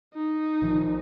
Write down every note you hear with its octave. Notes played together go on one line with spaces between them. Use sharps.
D#4
A#1 D#3 F3